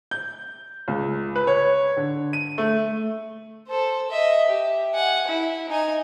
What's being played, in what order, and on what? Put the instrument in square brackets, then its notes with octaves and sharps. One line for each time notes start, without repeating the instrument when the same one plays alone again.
[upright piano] G6
C#2
B4
C#5
D3
D#7
A3
[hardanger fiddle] A4 C5
D#5 E5
G4
F#5 G#5
E4
D#4 G#5